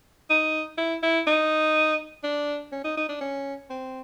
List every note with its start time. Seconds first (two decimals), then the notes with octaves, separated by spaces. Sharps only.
0.30 D#4
0.78 E4
1.03 E4
1.27 D#4
2.24 D4
2.72 C#4
2.84 D#4
2.97 D#4
3.09 D4
3.21 C#4
3.70 C4